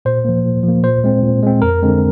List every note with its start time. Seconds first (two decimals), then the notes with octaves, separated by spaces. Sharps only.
0.05 A#2 C5
0.25 F3 A#3
0.45 A#2
0.63 F3 A#3
0.84 A#2 C5
1.04 G#3 C4
1.23 A#2
1.43 G#3 C4
1.62 F2 A#4
1.82 D3 G#3 C4